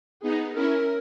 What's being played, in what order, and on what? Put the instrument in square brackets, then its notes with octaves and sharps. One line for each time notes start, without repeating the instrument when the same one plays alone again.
[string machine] B3 D#4 [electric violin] G#4
[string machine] C#4 E4 [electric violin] A#4